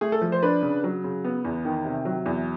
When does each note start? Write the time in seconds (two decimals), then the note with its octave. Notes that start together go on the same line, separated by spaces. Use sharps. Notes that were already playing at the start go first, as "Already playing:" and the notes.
0.01 A3 G#4
0.12 A4
0.21 F3
0.32 C5
0.43 D4 B4
0.62 C#3
0.84 F#3
1.04 C#3
1.24 B3
1.44 E2
1.65 D#3
1.85 C3
2.05 F#3
2.26 E2